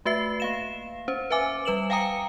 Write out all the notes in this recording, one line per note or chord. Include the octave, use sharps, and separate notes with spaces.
A3 F#4 B4 E5 C7
A#3 F5 E7
C#4 C5
B4 C5 E5 G#5 D6
G3 B4 E7 F#7
F5 G5 G#5 A#5 D#6 C#7